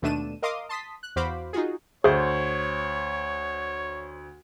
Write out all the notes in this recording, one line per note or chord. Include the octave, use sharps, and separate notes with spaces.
D#2 B2 A3 D4 D#7 E7
A#4 D#5 F5 C6 D6 D#6
A5 C6 D#6 B6
F#6
E2 F#4 C5 F5 B5 D6
D#4 F4 F#4 G#4
D2 G#4 C5 C#5 E5 F5